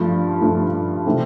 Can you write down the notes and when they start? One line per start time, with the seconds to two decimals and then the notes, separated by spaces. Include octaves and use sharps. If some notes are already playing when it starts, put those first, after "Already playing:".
Already playing: G2 F3 A3
0.41 G2 F3 A3
1.06 C3 E3 A3 C4